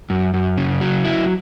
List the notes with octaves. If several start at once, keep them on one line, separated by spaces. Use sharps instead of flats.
F#2
F#2
C#3
F#3
E4